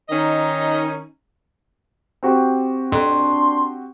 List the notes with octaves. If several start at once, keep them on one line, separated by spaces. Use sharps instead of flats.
D#3 C#4 D#4 D#5
C4 F#4 G4
F2 D4 C6